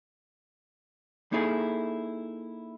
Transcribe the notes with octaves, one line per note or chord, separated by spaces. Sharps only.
A#3 D#4 E4 G#4 A4